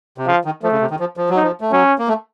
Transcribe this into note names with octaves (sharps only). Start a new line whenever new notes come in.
C3
C#3 F3
D#3
F3 A3
C#3
C3
D#3
F3
F3
F#3
D#4
F3
A3
F#3 C#4
A#3
A3